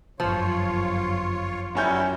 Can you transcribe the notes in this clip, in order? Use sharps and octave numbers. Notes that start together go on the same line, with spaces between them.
G1 F#2 F3 F4 C#5
F#2 G3 C#4 E4 F#4 G6